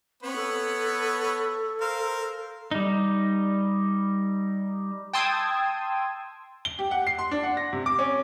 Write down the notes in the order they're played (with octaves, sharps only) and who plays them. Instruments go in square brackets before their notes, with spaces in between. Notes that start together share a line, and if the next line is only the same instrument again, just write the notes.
[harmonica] B3 B4 C#5 [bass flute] C4
[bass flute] A4
[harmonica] A#4 C5 F5
[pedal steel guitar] G3 D#4
[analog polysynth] G5 A5 C6 D#6 E6 G#6
[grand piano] G7
G4
F#5
C7
C6
D4
F#5
A#6
C3
D6
C#4